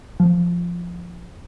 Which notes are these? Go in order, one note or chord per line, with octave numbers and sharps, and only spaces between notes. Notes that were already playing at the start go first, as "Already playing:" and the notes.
F3